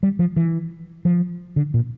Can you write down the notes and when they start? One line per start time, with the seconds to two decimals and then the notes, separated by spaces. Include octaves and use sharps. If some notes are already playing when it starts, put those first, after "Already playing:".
0.03 G3
0.19 F3
0.36 E3
1.05 F3
1.56 D3
1.74 A#2